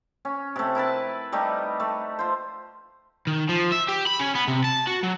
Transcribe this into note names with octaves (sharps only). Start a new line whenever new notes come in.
C#4
C3 A3
E4 A#4 B4 A5
G3 A3 D#4 G4
A3
F4 C5
D#3
F3
E5
G4
B5
C#4
B3
C3
A5
F#4
F#3